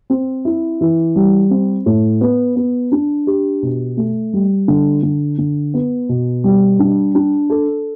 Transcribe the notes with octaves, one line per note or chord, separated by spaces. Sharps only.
C4
E4
E3
G3
C4
A2
B3
B3
D4
G4
B2
A3
G3
D3
D3
D3
B3
B2
G3
D4
D4
A4